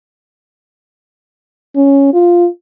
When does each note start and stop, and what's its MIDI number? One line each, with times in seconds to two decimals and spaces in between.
1.75 2.09 61
2.13 2.47 65